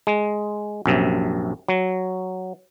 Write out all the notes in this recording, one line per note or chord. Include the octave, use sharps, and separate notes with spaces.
G#3
A#1 F#2 C3
F#3